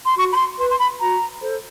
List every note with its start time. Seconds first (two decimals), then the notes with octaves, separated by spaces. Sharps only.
0.04 C6
0.17 F#4 C#6
0.32 B5
0.37 C6
0.58 B4 C6
0.70 C6
0.79 B5
1.00 F#4 A#5
1.41 A4 C5